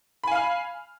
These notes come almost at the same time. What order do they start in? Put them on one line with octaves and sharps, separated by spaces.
B5 G#5 F5 F6